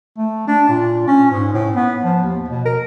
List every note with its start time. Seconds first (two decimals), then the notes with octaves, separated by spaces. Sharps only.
0.18 A3
0.47 D4
0.69 A#2
1.08 C#4
1.31 G#2
1.54 A2
1.75 B3
2.03 F3
2.23 D#2
2.49 B2
2.65 A#4